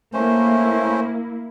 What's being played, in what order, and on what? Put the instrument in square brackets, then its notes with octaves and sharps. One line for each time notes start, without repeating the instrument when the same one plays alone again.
[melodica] A3 C#4 C5 [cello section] A#3 E4